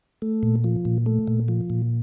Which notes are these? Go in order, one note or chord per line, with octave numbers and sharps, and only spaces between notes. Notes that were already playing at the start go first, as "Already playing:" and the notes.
A3
A#2
F3
A#2
A3
A#2
F3
A#2